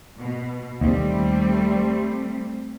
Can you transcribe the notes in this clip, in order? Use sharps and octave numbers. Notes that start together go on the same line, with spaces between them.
B2
D#2 G3 A3 C4